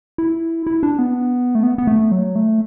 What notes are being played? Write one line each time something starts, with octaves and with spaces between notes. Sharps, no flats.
E4
E4
D4
B3
A3
B3
B3
A3
F#3
A3